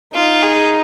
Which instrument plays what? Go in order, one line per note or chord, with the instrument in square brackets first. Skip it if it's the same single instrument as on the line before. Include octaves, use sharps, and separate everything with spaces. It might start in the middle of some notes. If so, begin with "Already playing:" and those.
[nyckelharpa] D#4 [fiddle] F4
[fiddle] G#4